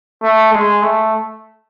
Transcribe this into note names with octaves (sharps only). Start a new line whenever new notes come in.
A3
G#3
A3